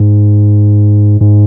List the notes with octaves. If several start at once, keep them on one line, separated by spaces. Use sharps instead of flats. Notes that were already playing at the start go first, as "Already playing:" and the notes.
Already playing: G#2
G#2